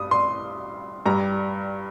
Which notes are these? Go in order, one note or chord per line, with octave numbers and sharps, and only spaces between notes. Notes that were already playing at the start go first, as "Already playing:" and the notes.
Already playing: G2 G3 D#6
C6
G2 G3 A#5